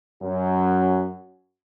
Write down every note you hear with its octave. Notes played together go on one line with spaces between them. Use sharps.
F#2 F#4